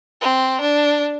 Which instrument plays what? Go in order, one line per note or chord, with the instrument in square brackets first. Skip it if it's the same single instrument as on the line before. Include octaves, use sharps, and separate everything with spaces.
[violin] C4
D4